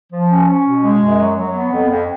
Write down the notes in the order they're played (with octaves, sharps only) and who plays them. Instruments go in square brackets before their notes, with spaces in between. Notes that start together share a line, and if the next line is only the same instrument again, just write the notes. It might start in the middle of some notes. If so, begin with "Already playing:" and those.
[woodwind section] F3
C#4
C#4
B2
G#3
F#2
F#3
F#3
B3
F2
F2